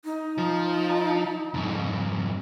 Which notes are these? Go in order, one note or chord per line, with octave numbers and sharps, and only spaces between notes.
D#4
F3
F2 G#2